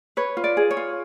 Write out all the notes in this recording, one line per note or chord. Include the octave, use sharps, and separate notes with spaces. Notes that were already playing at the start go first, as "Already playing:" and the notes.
B4 C#5
F4
D5
G#4
C#5
F4